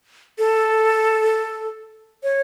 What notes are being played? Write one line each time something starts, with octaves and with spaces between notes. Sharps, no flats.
A4
C#5